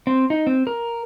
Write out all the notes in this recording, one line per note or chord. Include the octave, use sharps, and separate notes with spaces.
C4
D#4
C4
A#4